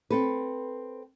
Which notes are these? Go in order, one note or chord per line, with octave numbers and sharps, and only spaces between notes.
C4 A4 B4